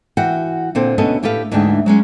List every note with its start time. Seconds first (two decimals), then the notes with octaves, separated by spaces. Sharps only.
0.17 E3 F#4 F#5 G5
0.75 A#2 D3 C4 A4 C5
0.98 D2 B2 B3 C#4 A4 D#5
1.23 A2 G4 A4 B4 F5
1.51 D2 G#2 E3 D4 G#4 G5
1.86 F#3 G#3 C#4